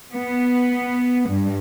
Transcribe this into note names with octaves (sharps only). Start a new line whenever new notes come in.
B3
G2